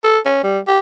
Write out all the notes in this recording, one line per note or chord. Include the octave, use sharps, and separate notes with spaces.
A4
C#4
G3
G4